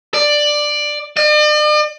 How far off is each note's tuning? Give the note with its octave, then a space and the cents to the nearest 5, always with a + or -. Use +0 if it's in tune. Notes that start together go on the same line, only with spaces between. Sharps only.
D5 +10
D5 +45